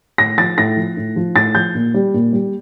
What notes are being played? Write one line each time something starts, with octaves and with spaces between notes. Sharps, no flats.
A2 A#6
F3 A6
A2 A#6
F3
A2
F3
A2 A6
F3 G6
A#2
G3
A#2
G3